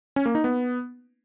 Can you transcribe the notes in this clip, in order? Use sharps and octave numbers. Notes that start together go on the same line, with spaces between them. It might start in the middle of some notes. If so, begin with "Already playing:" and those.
C#4
A#3
D#4
B3